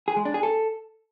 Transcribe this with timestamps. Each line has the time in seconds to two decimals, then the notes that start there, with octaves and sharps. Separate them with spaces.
0.08 G#4
0.17 G#3
0.25 D4
0.34 G#4
0.43 A4